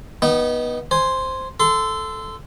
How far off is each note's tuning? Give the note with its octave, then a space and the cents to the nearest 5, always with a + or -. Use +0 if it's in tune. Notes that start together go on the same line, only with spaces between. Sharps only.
B3 -25 D#4 +0 G5 -45
C5 +0 G#5 +0
A4 +0 C6 -20